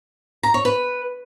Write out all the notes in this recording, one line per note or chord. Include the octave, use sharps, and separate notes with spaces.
A#5
C#5
B4